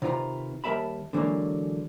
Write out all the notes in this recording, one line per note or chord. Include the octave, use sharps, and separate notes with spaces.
C3 D#3 F4 B4 D5 A#5
D#2 G3 A#4 E5 A5 B5
D3 E3 F#3 G#3 A#3